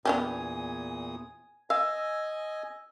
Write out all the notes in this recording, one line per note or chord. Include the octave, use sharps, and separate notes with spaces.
E2 A#2 B3 D4 G4 G#5 D#6
D#5 F5 G#5 E6